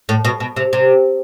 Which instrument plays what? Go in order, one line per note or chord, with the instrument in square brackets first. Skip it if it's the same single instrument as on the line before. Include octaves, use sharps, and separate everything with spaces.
[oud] A2
B2
B2
C3
C3